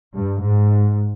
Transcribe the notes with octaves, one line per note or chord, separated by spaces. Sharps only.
G2
G#2